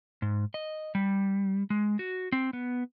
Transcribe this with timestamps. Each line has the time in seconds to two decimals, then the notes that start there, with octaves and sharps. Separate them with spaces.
0.22 G#2
0.54 D#5
0.95 G3
1.70 G#3
1.99 F#4
2.32 C4
2.53 B3